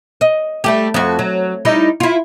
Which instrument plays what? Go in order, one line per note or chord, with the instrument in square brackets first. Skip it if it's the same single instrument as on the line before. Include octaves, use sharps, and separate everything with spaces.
[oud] D#5
G3 A3 G4
F2 F#4
F#3
G3 D#4 E4
E4 F4